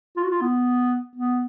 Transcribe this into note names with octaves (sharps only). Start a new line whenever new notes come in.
F4
F#4
F4
B3
B3